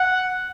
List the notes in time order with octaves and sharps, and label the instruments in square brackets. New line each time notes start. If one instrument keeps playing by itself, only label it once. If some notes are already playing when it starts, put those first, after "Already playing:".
Already playing: [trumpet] F#5